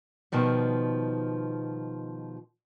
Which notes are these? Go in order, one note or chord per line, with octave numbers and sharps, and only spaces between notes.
B2 D#3 F3 G3